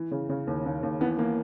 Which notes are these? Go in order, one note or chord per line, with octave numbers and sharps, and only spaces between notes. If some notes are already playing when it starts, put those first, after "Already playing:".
Already playing: E3
C#3
C#3
D#2
D#2
D#2
E3 B3
E3 A#3